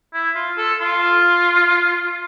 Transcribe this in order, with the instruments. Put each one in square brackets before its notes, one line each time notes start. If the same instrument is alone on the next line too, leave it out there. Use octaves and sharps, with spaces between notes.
[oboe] E4
F4
A4
F4